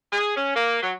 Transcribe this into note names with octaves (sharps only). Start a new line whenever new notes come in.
G#4
C#4
A#3
F#3